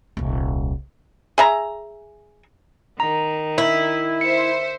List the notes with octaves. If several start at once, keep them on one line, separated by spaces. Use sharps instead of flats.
D#1 C2
G#4 E5 A#5
D#3 A#5
E4
C5 E5 C#7